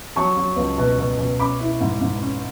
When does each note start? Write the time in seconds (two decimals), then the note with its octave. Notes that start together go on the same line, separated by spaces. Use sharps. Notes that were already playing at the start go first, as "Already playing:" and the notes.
0.16 F#3 A5 C#6
0.37 F#3
0.56 C#2
0.78 B2
0.98 B2
1.18 B2
1.39 C#4 B5 D6
1.60 E4
1.81 G#2
2.01 G#2
2.21 C#4